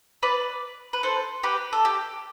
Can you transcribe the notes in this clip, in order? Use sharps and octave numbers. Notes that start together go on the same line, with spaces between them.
B4 D5
B4
A4 C5
G4 B4
A4
G4